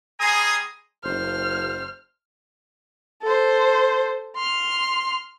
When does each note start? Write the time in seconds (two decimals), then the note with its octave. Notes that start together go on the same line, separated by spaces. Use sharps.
0.20 G3 G#4 G#5 A#5 C6 D#6
1.04 F#1 C5 F6
3.22 A4 C5
4.36 C6 F6